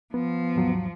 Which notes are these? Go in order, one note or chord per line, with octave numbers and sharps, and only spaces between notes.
F3 B3
D#2 G#2 F#3